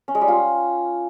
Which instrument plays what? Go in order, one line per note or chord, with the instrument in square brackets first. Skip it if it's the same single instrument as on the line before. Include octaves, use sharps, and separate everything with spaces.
[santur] C#4
G#3
G3
F4